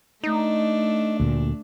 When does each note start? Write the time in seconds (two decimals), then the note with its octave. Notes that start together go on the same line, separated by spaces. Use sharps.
0.23 A3 D4 D#4
1.20 D2 A#2